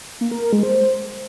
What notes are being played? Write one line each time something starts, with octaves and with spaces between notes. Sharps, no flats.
A#3
A#4
A#4
G#3
C5